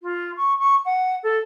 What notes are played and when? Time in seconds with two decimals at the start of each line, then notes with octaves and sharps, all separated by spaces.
0.01 F4
0.36 C#6
0.59 C#6
0.85 F#5
1.23 A4